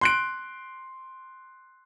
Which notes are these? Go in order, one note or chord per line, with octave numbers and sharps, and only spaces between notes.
C6 F#6 D7